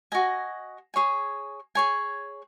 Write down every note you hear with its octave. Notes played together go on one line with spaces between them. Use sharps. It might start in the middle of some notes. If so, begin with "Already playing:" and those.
F#4 D#5 G#5
G#4 C#5 G#5
G#4 C#5 G#5